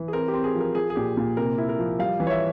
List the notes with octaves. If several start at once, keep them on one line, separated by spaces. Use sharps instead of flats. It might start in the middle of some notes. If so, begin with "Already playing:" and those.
Already playing: E3
G#4
C4 A#4
G4
C4
G#4
F3
A#4
F3 G#4
G#4
A#2 G4
A#2
C3 A#4
E4
A#4
F3
G3 F5
E3
C#5
E5